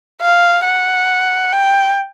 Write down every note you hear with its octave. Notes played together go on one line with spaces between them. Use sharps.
F5
F#5
G5